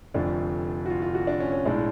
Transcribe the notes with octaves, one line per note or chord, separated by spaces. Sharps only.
F1 F2 D3 F3 D4
F#4
F4
F4
F#4
D4
C#4
C#4
B1 A2 G#3 D4